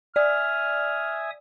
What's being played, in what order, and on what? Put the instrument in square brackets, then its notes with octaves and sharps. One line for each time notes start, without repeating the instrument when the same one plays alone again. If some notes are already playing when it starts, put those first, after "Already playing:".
[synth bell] D5 [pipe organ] E5 G#5 D#6 [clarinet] F6